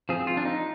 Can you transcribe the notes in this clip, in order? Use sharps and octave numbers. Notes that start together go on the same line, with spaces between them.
F3 C4 G#4
F4
D4
D#4